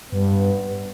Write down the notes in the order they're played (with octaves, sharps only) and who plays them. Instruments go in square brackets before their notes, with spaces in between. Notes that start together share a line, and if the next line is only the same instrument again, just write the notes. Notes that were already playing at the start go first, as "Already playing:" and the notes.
[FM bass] G2 [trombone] B3